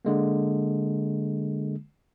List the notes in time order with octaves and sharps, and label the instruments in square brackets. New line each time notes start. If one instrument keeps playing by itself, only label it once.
[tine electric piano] D3 G#3 A#3